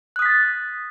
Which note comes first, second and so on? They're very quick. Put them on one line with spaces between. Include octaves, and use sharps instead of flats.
F#6 D#6 B6 A6